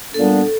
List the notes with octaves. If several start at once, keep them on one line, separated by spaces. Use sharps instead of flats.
A#2 G3 B3 D4 A4